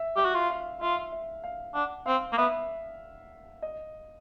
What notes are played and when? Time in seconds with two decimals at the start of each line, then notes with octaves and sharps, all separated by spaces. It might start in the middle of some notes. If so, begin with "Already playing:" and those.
Already playing: E5
0.16 G4 E5
0.25 F#4
0.34 F4
0.50 F5
0.81 F4 E5
1.12 E5
1.44 F5
1.74 D4 F#5
2.06 C4 F5
2.32 A#3
2.37 B3 E5
3.62 D#5